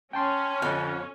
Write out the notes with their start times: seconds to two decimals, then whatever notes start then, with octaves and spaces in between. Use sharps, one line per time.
0.13 C#4 G5 A5 C6
0.62 F2 D3 F#6